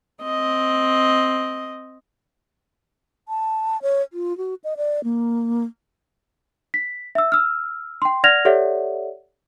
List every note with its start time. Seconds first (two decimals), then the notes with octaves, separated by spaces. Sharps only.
0.23 C4 D#5
3.29 A5
3.82 C#5
4.13 F4
4.38 F#4
4.64 D#5
4.77 D5
5.04 A#3
6.74 B6
7.15 E5 E6
7.32 E6 F6
8.02 G5 C6
8.24 D5 F#5 F6 G#6 A#6 F7
8.45 G4 A4 C#5 D5 E5 F#5